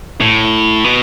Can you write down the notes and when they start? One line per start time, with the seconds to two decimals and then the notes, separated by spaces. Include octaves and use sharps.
0.21 A2
0.84 B2